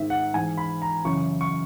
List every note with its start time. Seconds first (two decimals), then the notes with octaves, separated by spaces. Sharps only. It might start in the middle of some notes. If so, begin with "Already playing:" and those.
Already playing: G#2 D#3 E5
0.10 F#5
0.34 G#2 E3 G#5
0.58 B5
0.82 A#5
1.05 F#2 C#3 E3 C#6
1.41 C#6